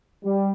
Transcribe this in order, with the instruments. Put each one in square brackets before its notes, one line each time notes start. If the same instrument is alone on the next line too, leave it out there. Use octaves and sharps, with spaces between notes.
[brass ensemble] G3